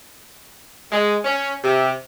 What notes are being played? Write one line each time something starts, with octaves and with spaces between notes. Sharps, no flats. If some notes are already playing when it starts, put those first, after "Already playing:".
G#3
C#4
C3